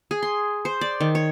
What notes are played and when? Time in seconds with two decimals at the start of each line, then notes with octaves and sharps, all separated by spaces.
0.11 G#4
0.22 C6
0.65 C5
0.81 D5
1.00 D#3
1.15 C#5